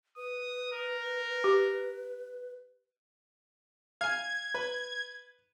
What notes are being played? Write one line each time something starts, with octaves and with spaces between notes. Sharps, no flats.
B4 D#6
A#4
G4
F5 G#5 G#6
B4